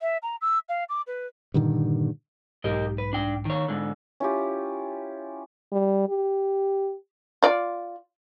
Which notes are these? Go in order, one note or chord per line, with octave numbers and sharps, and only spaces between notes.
E5
A#5
E6
F5
D6
B4
G2 A#2 D3 D#3
B1 G#2 G4 A#4 D#5
B4
D4 G5
D#3 C#5
G#2 D3
C#4 E4 F4 G4
G3
G4
F4 D5